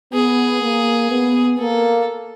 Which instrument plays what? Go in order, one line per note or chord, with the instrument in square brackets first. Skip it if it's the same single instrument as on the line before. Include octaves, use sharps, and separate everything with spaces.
[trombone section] B3 [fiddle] G#4
[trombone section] A#3
B3
[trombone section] A#3 [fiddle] A4